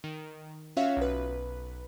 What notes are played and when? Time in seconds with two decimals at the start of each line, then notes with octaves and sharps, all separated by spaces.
0.04 D#3
0.77 C#4 F4 F#4 C#5 E5 F5
0.97 B1 B4